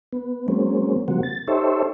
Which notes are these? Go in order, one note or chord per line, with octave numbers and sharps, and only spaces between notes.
B3
F#3 G#3 A#3 C4 C#4
C#3 F3 G3 A#3 C4 F#4
A6
D#4 G4 A4 C5 C#5 E5